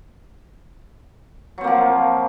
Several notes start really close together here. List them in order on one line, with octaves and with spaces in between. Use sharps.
F#3 C4 A#3 F3